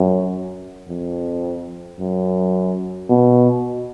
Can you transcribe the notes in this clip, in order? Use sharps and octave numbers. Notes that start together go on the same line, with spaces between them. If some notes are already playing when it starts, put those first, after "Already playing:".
Already playing: F#2
F2
F#2
B2